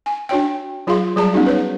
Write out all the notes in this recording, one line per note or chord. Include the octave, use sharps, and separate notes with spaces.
G#5
D4 F#4 C#5 G5
F#3 F4 G#4 F5 C6
F#3 G3 G#4 D5 A5 A#5
B3 C#4 D#4 F#4 G#4
B4 C#5